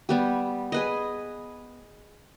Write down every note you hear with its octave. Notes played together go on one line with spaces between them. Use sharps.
G3 B3 G4
G#4 B4 D#5